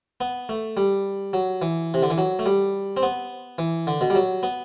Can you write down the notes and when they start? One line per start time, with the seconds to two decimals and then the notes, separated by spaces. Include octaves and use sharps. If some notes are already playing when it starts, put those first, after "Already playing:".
0.21 B3
0.49 A3
0.77 G3
1.33 F#3
1.62 E3
1.94 C3
2.02 D3
2.10 E3
2.18 F#3
2.39 A3
2.46 G3
2.97 C4
3.03 B3
3.58 E3
3.87 D3
4.01 B2
4.10 G3
4.15 F#3
4.43 B3